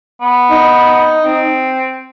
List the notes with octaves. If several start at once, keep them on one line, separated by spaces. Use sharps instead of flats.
B3
D#4
C4